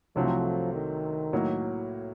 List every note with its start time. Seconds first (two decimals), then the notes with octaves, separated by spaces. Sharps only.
0.16 C2 C3 F3 F#3 A3 C4
0.74 D#3
1.33 A2 F#3 A#3